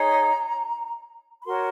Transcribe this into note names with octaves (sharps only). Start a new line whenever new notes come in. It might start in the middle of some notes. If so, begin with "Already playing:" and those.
Already playing: D#4 G#4 C#5 A#5
B5
F#4 A#4 C#5 C6